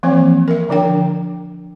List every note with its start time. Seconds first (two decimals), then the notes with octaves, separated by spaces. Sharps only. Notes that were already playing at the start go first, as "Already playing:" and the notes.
0.03 E3 F3 A#3 C4
0.48 A#4 E5
0.69 D3 F3 D4 G5